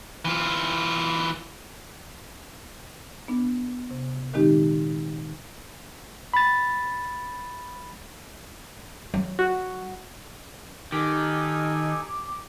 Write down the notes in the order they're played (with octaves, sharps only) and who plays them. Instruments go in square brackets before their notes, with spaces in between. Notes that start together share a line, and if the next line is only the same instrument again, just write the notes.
[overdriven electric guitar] E3 F4
[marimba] B3 D4
C3
A#2 D#3 G#3 C4 D#4 G4
[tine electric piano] B5 A6
[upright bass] F#3
[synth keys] F#4
[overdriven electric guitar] D#3 [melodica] D#4 A4 G#5 [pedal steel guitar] G4